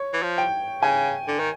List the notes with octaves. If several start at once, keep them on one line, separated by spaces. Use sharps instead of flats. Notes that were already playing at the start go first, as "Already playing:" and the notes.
Already playing: C#5
E3
F3
G5
C#3 G#5
D3
D#3